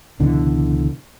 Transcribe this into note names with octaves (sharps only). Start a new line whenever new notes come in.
C#2 B2 D3 E3